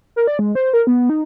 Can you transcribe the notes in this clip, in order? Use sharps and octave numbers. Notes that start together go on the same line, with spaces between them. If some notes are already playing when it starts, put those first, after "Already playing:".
A#4
D5
G#3
C5
A#4
B3
D#4